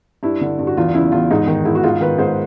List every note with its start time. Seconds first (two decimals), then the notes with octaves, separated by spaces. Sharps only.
0.23 G2 E4
0.41 D3
0.59 G2
0.67 F#4
0.77 E2 F4
0.94 C#3 E4
1.12 E2 F4
1.31 G#2 D#4
1.47 D#3
1.65 G#2 E4
1.75 F#4
1.83 G#2 F4
2.01 D#3 B4
2.18 G#2 C5